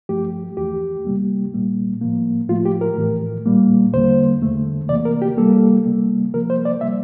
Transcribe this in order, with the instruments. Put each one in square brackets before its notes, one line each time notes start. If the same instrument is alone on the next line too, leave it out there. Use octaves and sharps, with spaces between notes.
[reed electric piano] G2 F3 A3 G4
E2 E3 A3 G4
C3 G3 A#3
A#2 G3 A#3
A2 F3 A#3
A2 F3 A3 F4
G4
A#4
A2 E3 A3
A#2 G3 A#3
E2 D3 G3 A#3 C5
E2 D3 A3
C3 E3 A#3 D5
A#4
G4
C3 G3 A#3 A4
C3 G3 A#3
C3 F3 A#3 A#4
C5
D5
C3 G3 A#3 E5